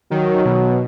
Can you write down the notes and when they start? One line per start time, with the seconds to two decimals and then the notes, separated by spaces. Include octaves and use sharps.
0.11 D#3 F#3
0.45 B2